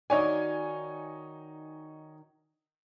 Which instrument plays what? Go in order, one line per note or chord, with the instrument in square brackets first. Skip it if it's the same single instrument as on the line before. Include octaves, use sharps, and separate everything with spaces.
[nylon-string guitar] D#3 F#4 D5 [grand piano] D#4 C#5 G#5